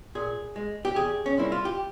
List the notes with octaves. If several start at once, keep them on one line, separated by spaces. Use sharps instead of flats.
A#2 G#4
G#3
G4
E2 G#4
C#4
C3 G3 A#3 E4
F4
G4